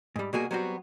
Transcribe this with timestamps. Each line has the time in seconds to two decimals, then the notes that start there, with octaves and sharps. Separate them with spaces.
0.16 G#2 G3
0.33 B2 G3 A#3 F#4 G#4
0.51 F#3 G3 B3 C4 F#4